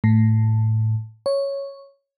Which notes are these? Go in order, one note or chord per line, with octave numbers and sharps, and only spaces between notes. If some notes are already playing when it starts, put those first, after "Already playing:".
A2
C#5